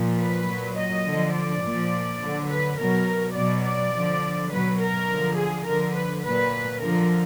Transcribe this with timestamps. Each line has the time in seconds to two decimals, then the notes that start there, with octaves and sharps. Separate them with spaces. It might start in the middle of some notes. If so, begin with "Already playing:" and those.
Already playing: A#2 F3
0.19 B4
0.47 A#2 F#3
0.77 D#5
1.06 D3 F3
1.34 D5
1.62 A#2
1.68 F3
2.21 D3 F#3
2.49 B4
2.78 B2 F#3 A#4
3.35 B2 F#3 D5
3.64 D5
3.93 D3 F3
4.50 B2 F#3 B4
4.80 A#4
5.09 D3 F3
5.37 G#4
5.66 D3 F3 A#4
5.95 B4
6.23 A#2 F#3 B4
6.81 D3 F3 A#4